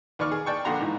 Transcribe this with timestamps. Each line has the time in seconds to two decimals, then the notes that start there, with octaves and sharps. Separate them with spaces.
0.19 D#2 B4 D5 C#6 F6
0.31 G#4
0.46 D5 G5 A5 C#6
0.65 A#1 D3 F#4 F#5 A#5 C6
0.81 G#2 E3